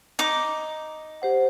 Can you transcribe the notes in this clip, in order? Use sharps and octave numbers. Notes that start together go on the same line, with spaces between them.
D#4 D6
G4 C5 F#5